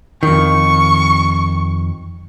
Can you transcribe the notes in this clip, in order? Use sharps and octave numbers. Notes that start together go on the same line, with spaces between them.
F2 D#3 C#6